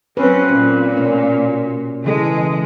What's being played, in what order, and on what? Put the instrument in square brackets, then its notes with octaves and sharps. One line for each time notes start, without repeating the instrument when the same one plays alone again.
[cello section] F#3 C4 C#4 [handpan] B4
[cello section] A#2
[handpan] B2 C#4
[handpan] C#3 E3 A4 [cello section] G#3